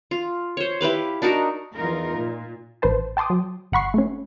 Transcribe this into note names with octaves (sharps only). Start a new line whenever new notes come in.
F4
C5 C#5
E4 G4 B4 F5
D4 D#4 F#4 A#4
E2 D#4 F4 A#4
A#2
A1 B4 C5 A5
G5 A5 C6 D6 D#6
F#3
G1 F#5 B5 C#6 C7
A3 C#4